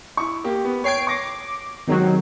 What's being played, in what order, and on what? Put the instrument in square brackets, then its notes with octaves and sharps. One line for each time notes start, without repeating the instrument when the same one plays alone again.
[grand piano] E4 C#6
A#3 G4
B3
[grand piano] C#5 G5 G#6 [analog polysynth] C7 D7
[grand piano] C#6 A#6 [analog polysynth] D6
[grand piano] C3 G#3 C4 [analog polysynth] D#3 F#3